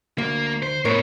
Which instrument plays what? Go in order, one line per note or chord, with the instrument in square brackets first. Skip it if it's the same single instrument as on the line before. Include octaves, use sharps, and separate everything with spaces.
[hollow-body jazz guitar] D2 [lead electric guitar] A#3
[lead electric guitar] C5
[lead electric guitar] A2 B3 [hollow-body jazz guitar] A#4 C#5